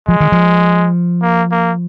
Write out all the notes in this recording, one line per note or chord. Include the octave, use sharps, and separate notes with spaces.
F3 G#3
D#3
F3
A#3
A#3